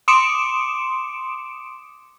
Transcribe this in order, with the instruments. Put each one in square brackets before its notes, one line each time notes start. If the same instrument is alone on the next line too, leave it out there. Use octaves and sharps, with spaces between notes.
[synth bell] C6 D6 D#6 C#7 D7 E7